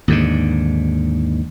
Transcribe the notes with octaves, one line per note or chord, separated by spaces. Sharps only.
D#2 G#2 D3